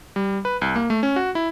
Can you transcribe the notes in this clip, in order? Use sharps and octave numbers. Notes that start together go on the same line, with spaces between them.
G3
B4
C2
A#3
A3
C#4
F#4
E4